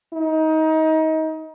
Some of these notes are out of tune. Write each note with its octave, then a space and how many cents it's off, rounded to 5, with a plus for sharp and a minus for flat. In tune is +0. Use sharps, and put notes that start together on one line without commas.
D#4 +25